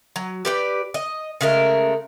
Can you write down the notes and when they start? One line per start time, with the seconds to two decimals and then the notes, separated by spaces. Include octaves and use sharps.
0.16 F#3
0.45 G4 B4 D5
0.94 D#5
1.41 C#3 G#3 A3 A#4